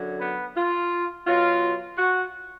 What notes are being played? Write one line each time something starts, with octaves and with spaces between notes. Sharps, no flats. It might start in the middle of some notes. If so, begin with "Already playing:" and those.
Already playing: F#2 D3 F#3
B3
F4
B2 F#3 F4
F#4